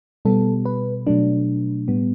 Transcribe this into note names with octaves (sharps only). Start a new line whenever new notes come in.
B2 G3 B3 A4
B4
B2 F#3 A3 D4
A2 G3 B3